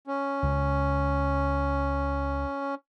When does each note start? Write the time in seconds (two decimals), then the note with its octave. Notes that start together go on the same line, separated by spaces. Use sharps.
0.07 C#4
0.43 C#2